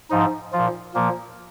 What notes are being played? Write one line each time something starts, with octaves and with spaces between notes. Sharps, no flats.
G#2 F3 D#4
A#2 F3 F4
A#2 F3 A#3